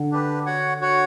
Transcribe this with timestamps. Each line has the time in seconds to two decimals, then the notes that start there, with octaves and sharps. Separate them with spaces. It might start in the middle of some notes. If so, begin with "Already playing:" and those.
Already playing: D3
0.11 D4 G4 B4
0.46 F#4 C#5 F#5
0.81 F#4 C#5 F#5